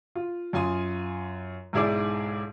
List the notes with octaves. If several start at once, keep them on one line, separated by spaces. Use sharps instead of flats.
F4
F#2 F4 G#5 C6 D#6
B1 G#2 E4 G#4 D5 D6